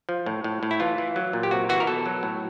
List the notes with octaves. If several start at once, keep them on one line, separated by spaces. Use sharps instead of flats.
F3
A2
A2
A2
E4
E3 F4
E3
F#3
A#2
G4
C3 F#4
E3 F#4
A#4
B2 A4
F#3
A2